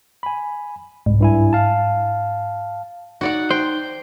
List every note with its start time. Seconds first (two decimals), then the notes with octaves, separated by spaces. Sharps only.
0.23 G#5 B5
1.06 C2 G#2
1.20 G2 E4 G#5
1.53 F5 A5
3.21 D#4 F#4 D5 F#5
3.50 C5 G5